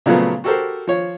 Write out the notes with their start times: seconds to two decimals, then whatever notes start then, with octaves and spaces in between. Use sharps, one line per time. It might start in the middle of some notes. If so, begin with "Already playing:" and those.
0.06 A#2 C#3 F3 F#3 A3 B3
0.44 F#4 G4 A4 A#4 C5
0.87 F3 C#5